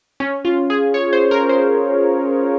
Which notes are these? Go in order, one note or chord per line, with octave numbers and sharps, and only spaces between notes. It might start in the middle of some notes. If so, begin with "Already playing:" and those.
C#4
F4
G#4
C#5
C5
A#4
C5